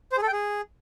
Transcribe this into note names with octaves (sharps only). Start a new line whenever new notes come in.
C5
G#4
A4
G5
G#4